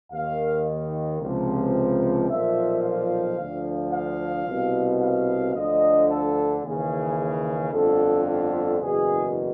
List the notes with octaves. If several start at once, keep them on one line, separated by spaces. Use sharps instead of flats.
D#2 D#3 F5
C#2 C3 F3
B1 A#2 F3 E5
F5
D2 D3 F3
F5
C2 B2
F5
D2 D3 F3 D#5
A4
D#2 C#3 E3 G#4
G#4
G1 F2 D3 A4
A4
F#1 E2 B2 G#4